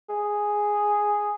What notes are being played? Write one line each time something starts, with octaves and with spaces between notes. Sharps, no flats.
G#4